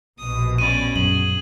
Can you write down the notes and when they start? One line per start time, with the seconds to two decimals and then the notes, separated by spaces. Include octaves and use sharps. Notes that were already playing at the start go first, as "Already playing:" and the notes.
0.18 A#1 B2 D#6
0.58 C#4 D5 D#7
0.96 F#2 G#4 F#7